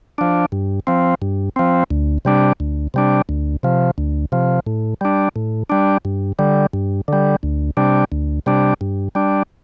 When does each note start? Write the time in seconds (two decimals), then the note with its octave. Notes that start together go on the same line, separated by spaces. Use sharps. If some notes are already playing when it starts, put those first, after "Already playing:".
0.18 F3 D4
0.52 G2
0.87 F3 C4
1.22 G2
1.56 F3 C4
1.91 D2
2.25 C3 G3 D4
2.60 D2
2.94 C3 G3 D4
3.29 D2
3.63 C3 F3
3.98 D2
4.32 C3 F3
4.67 A2
5.01 G3 D4
5.36 A2
5.70 G3 D4
6.05 G2
6.39 D3 G3
6.74 G2
7.08 D3 G3
7.43 D2
7.77 C3 G3 D4
8.12 D2
8.46 C3 G3 D4
8.81 G2
9.15 G3 D4